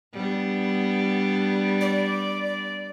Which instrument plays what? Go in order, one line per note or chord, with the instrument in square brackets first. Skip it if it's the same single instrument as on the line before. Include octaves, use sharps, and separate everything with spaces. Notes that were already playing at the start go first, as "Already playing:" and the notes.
[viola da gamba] G3 B3 D4
[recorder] D5